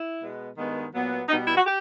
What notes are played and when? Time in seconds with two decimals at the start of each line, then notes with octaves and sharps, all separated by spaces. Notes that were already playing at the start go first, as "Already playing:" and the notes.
Already playing: E4
0.21 B2 G#3 B3
0.57 G2 D#3 G#3 B3
0.93 A#2 F#3 B3
1.28 B2 G3 B3 D#4
1.47 E4
1.56 F#4
1.65 G4